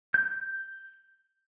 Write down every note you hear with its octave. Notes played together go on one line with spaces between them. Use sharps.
G6